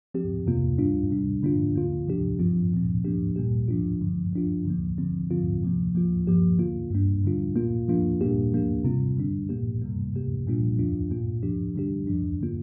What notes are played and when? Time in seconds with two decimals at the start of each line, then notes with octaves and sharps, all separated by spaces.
0.14 F3 C4 G4
0.46 F2 C3 A#3 F4
0.78 G2 G3 D4 F4
1.10 C3 G3 D4
1.43 D3 A#3 D4 F4
1.75 D3 A#3 F4
2.08 C3 F3 D4 G4
2.39 G2 F3 C4 F4
2.72 A#2 F3 C4
3.05 F3 A#3 D4 G4
3.36 A#2 G3 A#3 G4
3.68 F3 D4 F4
4.01 G2 D3 F3
4.33 F3 D4 F4
4.65 D3 F3 A#3
4.98 D3 F3 C4
5.31 D3 F3 C4 F4
5.63 C3 F3 A#3
5.95 F3 A#3 F4
6.27 G2 F3 A#3 G4
6.59 D3 A#3 F4
6.91 G2 G3 A#3 D4
7.24 D3 G3 D4 F4
7.56 A#2 A#3 F4
7.88 F3 A#3 D4 F4
8.21 A#2 G3 A#3 D4 G4
8.52 F3 A#3 D4 G4
8.84 C3 G3 C4 F4
9.17 D3 G3 D4
9.49 A#2 A#3 G4
9.82 C3 G3 A#3
10.14 C3 A#3 G4
10.47 A#2 G3 A#3 D4 F4
10.79 F2 F3 D4 F4
11.10 A#2 A#3 F4
11.43 F3 D4 G4
11.75 D3 G3 D4 G4
12.07 F2 F3 D4
12.41 D3 A#3 F4